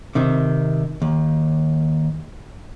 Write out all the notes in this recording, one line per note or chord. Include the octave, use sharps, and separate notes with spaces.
C3 D#3
D#2